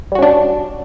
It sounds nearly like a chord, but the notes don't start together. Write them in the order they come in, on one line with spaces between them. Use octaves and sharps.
G3 F#4 C#4 D4